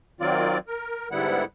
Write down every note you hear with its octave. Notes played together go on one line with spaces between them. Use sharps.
D#3 F#3 C4 F4 D5
A#4
G#2 D3 G3 B3 E4 F#5